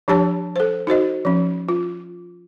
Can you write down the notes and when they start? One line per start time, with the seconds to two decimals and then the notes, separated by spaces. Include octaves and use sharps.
0.08 F3 D4 G4 C#5 A5
0.56 A4 C5
0.87 D#4 F#4 C5 D#5
1.25 F3 C#4
1.69 F4